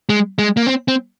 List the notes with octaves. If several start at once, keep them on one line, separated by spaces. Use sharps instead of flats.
G#3
G#3
A#3
C4
C4